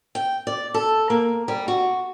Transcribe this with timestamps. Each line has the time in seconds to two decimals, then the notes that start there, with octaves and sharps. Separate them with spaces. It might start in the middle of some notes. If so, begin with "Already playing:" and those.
0.15 G5
0.47 D5
0.74 A4
1.10 A#3
1.48 G3
1.68 F#4